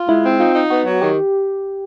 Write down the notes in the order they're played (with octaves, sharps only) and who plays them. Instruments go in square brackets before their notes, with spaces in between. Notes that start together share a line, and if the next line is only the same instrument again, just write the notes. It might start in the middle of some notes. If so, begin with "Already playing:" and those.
Already playing: [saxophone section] F4
[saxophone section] G#3 [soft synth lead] E4
[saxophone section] C4
[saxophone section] D#4 [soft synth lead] F4
[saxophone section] D#4
[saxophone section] B3 [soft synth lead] F#4
[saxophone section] F#3
[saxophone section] D#3 [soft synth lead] G4